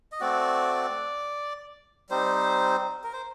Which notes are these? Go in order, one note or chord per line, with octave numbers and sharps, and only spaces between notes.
D#5
A3 C4 F#4 D5
G3 C4 D#4 C5
A#4
C5